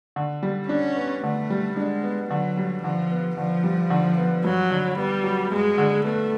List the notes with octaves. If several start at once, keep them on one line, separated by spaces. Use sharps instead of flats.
D3
G3
C#4 D4
B3
D3 A3
G3
G#3 D4
B3
D3 F#3
G3
D3 F3
B3
D3 F3
G3
D3
B3
G2 F#3
D3
G3 B3
F#3
G2 G#3
D3
A3 B3